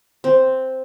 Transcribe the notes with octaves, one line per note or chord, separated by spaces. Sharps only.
C4